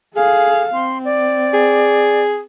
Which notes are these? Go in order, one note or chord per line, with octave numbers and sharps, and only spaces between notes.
G#4 A4 F5
C4 C6
D5
G#4